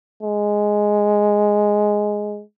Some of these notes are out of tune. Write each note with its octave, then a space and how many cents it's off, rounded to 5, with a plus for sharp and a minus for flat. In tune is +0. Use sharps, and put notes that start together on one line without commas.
G#3 +0